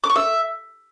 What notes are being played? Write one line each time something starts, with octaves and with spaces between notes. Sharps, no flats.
D6
C#6
E5